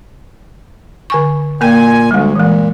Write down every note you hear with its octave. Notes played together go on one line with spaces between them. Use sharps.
D3 G#5 C#6
A#2 A#3 A#4 G5 G#5
D2 G3 G#3
A#2 E3 G#3